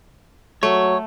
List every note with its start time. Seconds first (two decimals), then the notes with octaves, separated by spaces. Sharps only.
0.63 F#3 A3 C#5